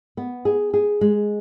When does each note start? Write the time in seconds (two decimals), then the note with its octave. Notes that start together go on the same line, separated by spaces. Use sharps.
0.17 B3
0.45 G#4
0.74 G#4
1.01 G#3